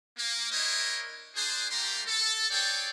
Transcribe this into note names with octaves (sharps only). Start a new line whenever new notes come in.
A#3
D4 E4 A#4 C5 C#5 D#5
D4 G#4 C5
G3 A3 A#3 G4 A#5 C6
A4
G#4 A4 C#5 D5 G5